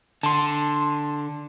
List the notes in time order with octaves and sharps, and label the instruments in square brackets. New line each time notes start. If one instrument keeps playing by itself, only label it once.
[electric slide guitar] D3 [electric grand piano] A5 C6